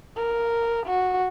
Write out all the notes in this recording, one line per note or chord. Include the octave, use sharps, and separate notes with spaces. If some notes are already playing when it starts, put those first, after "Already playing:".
A#4
F#4